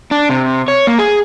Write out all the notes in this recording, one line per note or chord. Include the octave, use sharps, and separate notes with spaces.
D4
C3
C#5
A#3
G#4